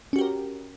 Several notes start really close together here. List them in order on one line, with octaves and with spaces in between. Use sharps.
C#4 F#4 G4 A#4